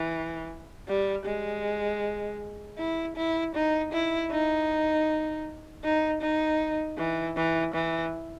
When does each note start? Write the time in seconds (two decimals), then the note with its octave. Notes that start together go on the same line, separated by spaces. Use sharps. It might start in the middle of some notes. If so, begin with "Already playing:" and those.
Already playing: E3
0.88 G3
1.26 G#3
2.78 E4
3.16 E4
3.55 D#4
3.92 E4
4.31 D#4
5.84 D#4
6.21 D#4
6.98 E3
7.37 E3
7.75 E3